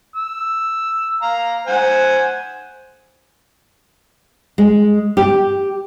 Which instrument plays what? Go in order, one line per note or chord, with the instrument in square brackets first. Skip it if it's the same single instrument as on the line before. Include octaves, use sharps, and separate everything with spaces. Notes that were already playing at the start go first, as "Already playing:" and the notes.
[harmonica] E6
F5 A#5
C5 F#5 G#5
[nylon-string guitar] G#3
G4